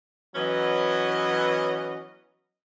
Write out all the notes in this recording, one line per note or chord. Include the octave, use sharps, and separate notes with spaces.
E3 F#3 B3 C#4 D#5